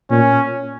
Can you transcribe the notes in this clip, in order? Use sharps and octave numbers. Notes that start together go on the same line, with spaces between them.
A#2 C#4